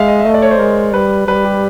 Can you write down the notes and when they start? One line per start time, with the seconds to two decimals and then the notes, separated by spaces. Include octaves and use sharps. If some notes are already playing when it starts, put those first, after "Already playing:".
Already playing: G#3 E5 F5
0.08 D#5
0.20 E5
0.26 A3 D#5
0.34 D5
0.42 C#5
0.51 C5
0.59 G#3 A#4
0.94 G3 B4
1.27 G3 B4
1.44 G4